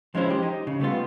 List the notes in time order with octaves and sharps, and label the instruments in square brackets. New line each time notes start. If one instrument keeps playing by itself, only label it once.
[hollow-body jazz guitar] F3 G#3 C#4 E4 C5
G4
D#4
C#3
G3 A3 B3 F4